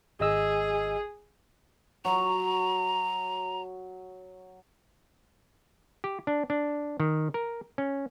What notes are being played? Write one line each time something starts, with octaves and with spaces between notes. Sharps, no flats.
G#1 G#4 D#5 E6
F#3 A#5
G4
D4
D4
D#3
A#4
C#4